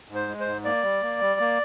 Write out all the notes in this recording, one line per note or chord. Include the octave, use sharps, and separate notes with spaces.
G#2
C5
G#3
C5
G#2
A#3 D5
G3
A#3
G3
A#3